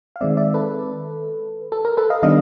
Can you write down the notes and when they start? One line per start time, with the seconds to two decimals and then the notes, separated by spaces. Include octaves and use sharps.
0.16 F5
0.21 D#3 G#3 C4 D5 E5
0.37 D5 E5
0.54 A4 B4
1.72 A4
1.85 A#4
1.97 A4 B4
2.10 D#5 F5
2.23 D#3 G3 B3 D4 D#5 F5